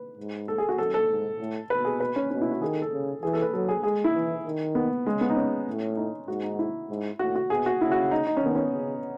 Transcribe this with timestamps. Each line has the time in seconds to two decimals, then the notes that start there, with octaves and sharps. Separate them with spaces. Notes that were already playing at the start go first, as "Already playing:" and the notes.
Already playing: B4
0.17 G#2
0.48 A4
0.58 G#4
0.69 F#4
0.78 F#2 A4
0.94 A4
1.09 G#2
1.39 A2
1.70 B2 B4
1.85 G#4
2.00 B4
2.16 C#4
2.30 B2 C#4
2.41 E4
2.51 F#4
2.62 D#3 G#4
2.72 A4
2.82 A4
2.92 C#3
3.23 E3 G#4
3.33 A4
3.42 B4
3.53 F#3 A4
3.69 G#4
3.83 G#3 G#4
4.04 E4
4.14 E3
4.45 D#3
4.75 B3
5.05 C#3 G#3
5.21 B3
5.30 D#4
5.36 C#4
5.67 A2
5.97 D#4
6.28 G#2 F#4
6.43 D#4
6.59 E4
6.89 G#2
7.19 A2 F#4
7.36 F#4
7.50 B2 G#4
7.66 F#4
7.81 C#3 E4
7.92 F#4
8.11 D#4
8.27 D#4
8.37 C#4
8.42 D#3 B3
8.55 C#4
8.73 C#3